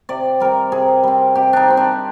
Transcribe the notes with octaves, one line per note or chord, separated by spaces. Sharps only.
C3 D5
G3 C4 A#4
C3 G#4
G3 C4
C3 G4
D4 D#4
G3 C4
D4